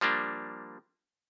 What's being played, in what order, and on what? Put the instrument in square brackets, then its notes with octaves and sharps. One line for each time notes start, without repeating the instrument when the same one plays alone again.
[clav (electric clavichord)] F3 G3 A#3 D4